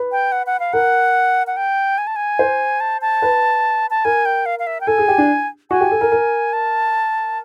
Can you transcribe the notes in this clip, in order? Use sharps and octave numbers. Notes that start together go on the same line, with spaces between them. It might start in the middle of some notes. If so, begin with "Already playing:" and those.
Already playing: B4
G5
F#5
F#5
F5
A#4 F#5
F#5
G5
G#5
A5
G#5
C5
A5
A5
B4
A5
A#4 G#5
G5
F5
F5
E5
G5
A4 G#5
G#4
G4
D4
F#4 G#5
G4
A4
A#4
A#4
A5